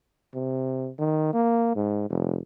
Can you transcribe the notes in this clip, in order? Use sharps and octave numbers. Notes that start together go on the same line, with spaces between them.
C3
D#3
A#3
G#2
F1